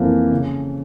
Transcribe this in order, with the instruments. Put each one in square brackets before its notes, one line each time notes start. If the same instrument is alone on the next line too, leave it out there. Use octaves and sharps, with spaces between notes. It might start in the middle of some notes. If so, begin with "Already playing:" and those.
Already playing: [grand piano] F2 E3 A#3 A4
C#3